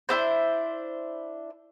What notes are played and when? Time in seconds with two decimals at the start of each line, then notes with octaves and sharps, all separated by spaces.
0.09 D4 E4 G4 C5